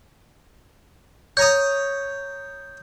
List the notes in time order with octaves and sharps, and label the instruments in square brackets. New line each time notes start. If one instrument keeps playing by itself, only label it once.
[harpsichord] C#5 A#5 D#6 [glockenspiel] G6